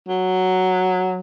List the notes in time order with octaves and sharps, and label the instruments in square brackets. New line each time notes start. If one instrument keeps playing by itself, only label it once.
[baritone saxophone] F#3